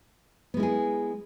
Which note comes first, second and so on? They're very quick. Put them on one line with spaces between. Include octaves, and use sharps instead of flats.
B3 G#3 E4 G#4